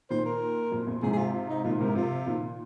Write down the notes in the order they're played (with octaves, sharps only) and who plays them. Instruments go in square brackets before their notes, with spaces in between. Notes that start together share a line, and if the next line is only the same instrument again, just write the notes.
[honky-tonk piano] A#2 D#3 [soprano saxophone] C5
[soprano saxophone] A#4
[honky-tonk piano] F2 A#2
F2 A#2
[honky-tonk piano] G#2 C3 [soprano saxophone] G#4
[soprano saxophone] G#4
F4
F4
D#4
[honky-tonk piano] A#2 D#3 [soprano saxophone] F4
[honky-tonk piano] G#2 C3 [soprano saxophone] A#4
[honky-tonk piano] C3 F3 [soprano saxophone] F4
[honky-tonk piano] A#2 D#3